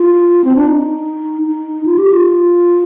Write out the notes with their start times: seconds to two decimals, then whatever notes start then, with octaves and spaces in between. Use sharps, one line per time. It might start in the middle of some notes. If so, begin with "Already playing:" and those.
Already playing: F4
0.44 C4
0.56 D4
0.67 D#4
1.46 D#4
1.86 F4
1.98 G4
2.12 F4